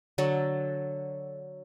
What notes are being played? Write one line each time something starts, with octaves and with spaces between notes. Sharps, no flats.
D3 F#3 A4